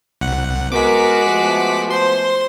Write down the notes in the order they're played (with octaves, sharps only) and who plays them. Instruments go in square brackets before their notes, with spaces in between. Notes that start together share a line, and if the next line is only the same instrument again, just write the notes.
[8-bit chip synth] C2 F#5
[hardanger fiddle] G#3 F#4 [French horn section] B3 A#4 [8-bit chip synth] D6 B6
[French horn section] F3 A3 B3
[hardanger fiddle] C5 [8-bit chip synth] C6